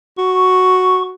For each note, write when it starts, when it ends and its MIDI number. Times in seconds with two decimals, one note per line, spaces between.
0.18 1.13 66
0.18 1.03 85